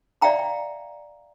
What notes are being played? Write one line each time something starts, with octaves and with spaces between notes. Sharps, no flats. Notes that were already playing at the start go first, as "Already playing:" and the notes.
D5 E5 F5 G5 A#5 B5